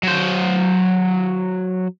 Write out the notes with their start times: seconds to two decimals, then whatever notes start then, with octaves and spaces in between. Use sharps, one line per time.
0.03 F#3 C5